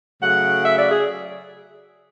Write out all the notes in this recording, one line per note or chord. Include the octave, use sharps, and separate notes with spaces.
C#3 F#3 A3 F#5
E5
D5
G#4